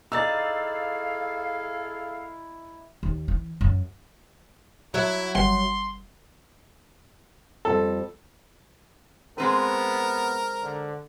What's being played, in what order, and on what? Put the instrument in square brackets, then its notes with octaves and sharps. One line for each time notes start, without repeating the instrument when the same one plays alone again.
[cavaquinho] D#4 D5 [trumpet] E4 [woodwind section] G#4 A4 F5 [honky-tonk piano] E6 A6
[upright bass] D#2
E3
F#2
[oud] F#3 E5 [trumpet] E4
[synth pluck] G1 G3 F#5 [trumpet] C6
[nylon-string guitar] F2 G3 [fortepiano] A4
[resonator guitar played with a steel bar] G#3 C4 B4 [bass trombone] B3 [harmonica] A#4
[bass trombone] D3